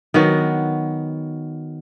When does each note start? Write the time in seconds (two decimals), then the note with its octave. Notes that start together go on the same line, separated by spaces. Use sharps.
0.14 D#3 F#3 B3 F#4